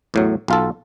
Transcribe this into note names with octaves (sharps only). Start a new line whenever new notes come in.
E2 A2 F#3
B1 F4 A4